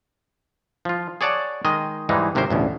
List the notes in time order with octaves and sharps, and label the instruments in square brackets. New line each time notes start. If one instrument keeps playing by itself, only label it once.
[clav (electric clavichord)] F3 F4
G#4 C#5 D5 F#5 A5
D#3 G#3 D#5
G#2 E3 G3 G#3 D#4
G#1 C3 C#4 A#4 C5
A1 D2 B2